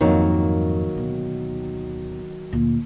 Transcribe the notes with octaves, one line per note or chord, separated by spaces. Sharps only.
F2 G#2 D#3 F#3 A#3
D1 B2
D2 A#2